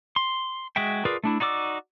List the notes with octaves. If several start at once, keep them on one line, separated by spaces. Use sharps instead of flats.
C6
G#3 F#4 E5 G5
F4 G#4 A#4 B4 D5
A3 D4 E4
D#4 F#4 D5 D6 E6